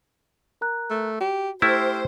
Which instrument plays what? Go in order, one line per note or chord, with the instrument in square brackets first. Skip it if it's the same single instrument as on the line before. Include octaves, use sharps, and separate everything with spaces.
[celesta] A#4 A#5 F#6
[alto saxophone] A3
[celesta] F#4 [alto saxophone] G4
[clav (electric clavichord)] A3 E4 [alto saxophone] G4 [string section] C5 [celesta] F6